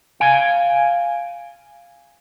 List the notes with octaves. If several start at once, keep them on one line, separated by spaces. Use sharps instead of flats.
F5 G#5